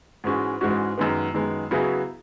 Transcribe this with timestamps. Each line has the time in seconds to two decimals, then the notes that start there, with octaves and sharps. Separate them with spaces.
0.24 G#2 E3 G#3 C#4 F#4
0.61 G#2 E3 G#3 C#4 F#4
0.98 F#2 D#3 G#3 B3
1.34 F#2 D#3 G#3 B3
1.71 C#3 F#3 B3 E4 G#4